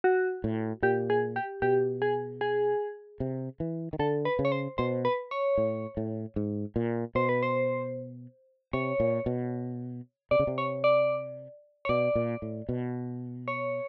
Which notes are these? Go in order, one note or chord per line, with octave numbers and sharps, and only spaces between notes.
F#4
A2
A#2 G4
G#4
G4
B2 G4
G#4
G#4
C3
E3
D#3
D3 A4
B4
C#3
C#5
C5
B2 C5
B4
C#5
A2
A2
G#2
A#2
B2 C5
B4
C5
C3 C#5
A#2
B2
C3 D5
C#3
C3
C#5
D5
C#5
B2 D5
A#2
A2
B2
C#5